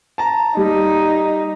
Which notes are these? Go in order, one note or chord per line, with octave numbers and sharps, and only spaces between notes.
A5 A#5
G3 D#4